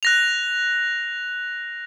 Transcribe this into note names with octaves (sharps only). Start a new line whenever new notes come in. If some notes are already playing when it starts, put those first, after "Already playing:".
F#6 A#6 F7